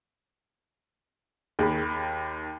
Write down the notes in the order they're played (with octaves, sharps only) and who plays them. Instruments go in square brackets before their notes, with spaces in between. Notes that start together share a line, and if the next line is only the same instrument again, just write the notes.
[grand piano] D#2 [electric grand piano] D#3 B5 [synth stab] G#4